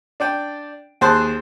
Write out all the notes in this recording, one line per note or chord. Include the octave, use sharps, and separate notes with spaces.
D4 D5 G5
D#2 G#4 C5 A5 C6 F#6